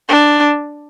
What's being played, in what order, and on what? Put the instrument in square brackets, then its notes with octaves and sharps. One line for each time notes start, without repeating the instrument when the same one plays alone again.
[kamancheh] D4